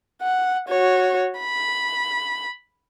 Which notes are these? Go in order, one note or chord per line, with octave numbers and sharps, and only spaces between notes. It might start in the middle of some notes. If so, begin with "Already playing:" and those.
F#5
F#4 C#5
B5